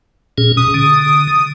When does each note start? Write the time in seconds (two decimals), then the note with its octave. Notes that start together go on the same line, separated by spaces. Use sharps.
0.38 A#2 C#4 G#4
0.57 B2 D#6
0.74 D3